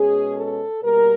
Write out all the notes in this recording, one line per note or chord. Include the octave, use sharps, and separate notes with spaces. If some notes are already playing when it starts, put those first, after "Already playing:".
Already playing: B2 G#3 C#4 G#4
A4
B2 G3 A#3 A#4